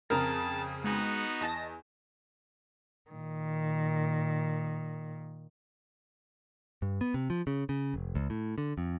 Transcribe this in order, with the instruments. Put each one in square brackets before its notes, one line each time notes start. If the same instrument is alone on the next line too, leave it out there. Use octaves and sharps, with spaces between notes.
[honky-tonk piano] F2 C#3 [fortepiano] A#4 A#5 [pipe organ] A5
[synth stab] G#3 [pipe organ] B3 D#4 F#4
[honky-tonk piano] E2 [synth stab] D#5 A5 A#6
[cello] A#2 D#3
[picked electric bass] G2
B3
C3
F3
C#3
C#3
F1
C#2
A2
D3
F2